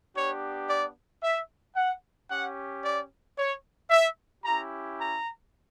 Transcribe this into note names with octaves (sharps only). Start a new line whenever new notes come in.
B3 D4 G4 C#5
D5
E5
F#5
C#4 G4 F#5
D5
C#5
E5
C#4 E4 G4 A#5
A#5